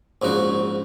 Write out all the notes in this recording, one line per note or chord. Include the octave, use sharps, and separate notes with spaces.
A#1 G#2 C#3 F#4